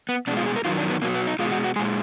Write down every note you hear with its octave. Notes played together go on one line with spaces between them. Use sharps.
B3
B2 G#3 D4
F4
G#4
A#4
F#2 D#3 F#3 F4
D4
B3
B2 F#3 A#3
B3
D#4
B2 G#3 F4
F#4
F#4
A#2 G#3 G#4